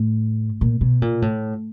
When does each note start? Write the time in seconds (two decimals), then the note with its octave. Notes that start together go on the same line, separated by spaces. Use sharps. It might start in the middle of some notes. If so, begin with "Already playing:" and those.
Already playing: A2
0.61 A#2
0.81 B2
1.02 A#2
1.22 A2